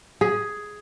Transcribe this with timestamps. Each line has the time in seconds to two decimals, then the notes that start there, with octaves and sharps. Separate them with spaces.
0.21 G#4